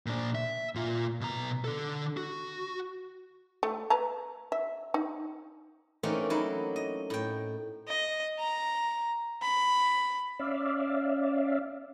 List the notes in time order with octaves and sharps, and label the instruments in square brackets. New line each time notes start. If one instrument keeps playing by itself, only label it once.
[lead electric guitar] A#2 D4
E5
A#2 F4
B2 A#5
D3 A4
F#4
[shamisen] A3
B4 A5 A#5
E5
D#4
[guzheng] E3 A3 A#3 C4 C#4 D#4
F#3 D#4 E4
D#5
A2 G5
[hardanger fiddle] D#5
A#5
B5
[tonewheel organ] C#4 D5 E5 F5